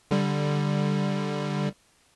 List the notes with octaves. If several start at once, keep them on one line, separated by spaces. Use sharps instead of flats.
D3 G3